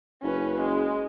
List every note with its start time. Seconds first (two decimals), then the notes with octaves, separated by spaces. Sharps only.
0.23 F#1 C#4 B4
0.60 G#3